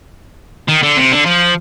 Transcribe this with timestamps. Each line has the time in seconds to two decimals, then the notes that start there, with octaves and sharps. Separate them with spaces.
0.68 D#3
0.82 D3
0.97 C3
1.11 D3
1.26 F3